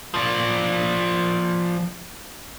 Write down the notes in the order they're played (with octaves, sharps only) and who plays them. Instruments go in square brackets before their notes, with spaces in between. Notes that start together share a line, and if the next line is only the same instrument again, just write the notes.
[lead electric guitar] F3 D5